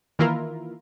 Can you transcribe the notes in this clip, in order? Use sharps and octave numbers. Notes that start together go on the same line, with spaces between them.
D#3 E3 A#3 E4 F4 A#4